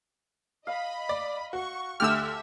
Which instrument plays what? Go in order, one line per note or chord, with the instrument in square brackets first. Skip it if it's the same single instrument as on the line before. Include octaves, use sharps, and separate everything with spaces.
[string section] D#5 B5 [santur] F5
[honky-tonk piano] D5
[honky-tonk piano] F#4 [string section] C#6
[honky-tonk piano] D2 D3 [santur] G4 [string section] A4 E5 [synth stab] E6 F6